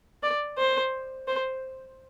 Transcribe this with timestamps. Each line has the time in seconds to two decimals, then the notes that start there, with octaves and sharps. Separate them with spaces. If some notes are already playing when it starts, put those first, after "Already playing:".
0.23 D5
0.58 C5
1.28 C5